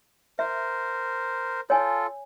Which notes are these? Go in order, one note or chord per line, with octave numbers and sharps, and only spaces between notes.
A#4 C5 E5
F4 A4 C#5 G#5